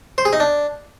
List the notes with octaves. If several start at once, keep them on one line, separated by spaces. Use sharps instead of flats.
C5
G#4
D#4
D4